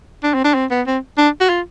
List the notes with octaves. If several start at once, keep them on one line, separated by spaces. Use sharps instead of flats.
D4
C4
D4
C4
B3
C4
D4
F#4
F4